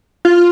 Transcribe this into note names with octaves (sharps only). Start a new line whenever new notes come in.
F4